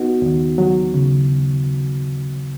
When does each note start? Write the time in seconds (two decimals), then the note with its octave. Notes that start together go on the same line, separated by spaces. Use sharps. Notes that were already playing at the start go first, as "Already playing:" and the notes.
Already playing: B3 D#4 F#4
0.22 D#2
0.58 F#3
0.94 C#3